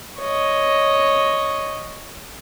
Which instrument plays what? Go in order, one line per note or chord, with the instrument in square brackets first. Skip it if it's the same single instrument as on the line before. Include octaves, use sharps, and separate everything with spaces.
[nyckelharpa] C#5 D#5